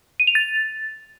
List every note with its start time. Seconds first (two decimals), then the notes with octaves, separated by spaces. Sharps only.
0.20 D#7
0.27 F7
0.35 A6